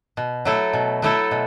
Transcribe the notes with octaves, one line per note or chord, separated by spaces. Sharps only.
B2
F#3 A3 E4 A4
B2
F#3 A3 E4 A4
B2